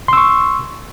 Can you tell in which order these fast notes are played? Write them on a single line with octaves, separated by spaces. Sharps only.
C6 E6 C#6